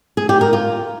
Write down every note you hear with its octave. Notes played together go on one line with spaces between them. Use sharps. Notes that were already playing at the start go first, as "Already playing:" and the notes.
G#4
G4
A#4
F4